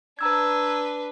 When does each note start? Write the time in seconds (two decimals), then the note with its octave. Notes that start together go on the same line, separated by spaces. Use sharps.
0.19 D4 B4 A#5 E6 G#6